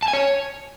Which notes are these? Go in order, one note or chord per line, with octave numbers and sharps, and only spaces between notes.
A5
G#5
C#5